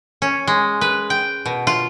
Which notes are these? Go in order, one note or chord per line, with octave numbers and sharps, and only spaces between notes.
C#4
G#3
B4
G5
B2
F4